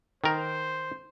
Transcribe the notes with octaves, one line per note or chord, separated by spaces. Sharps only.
D#3 A#4 C5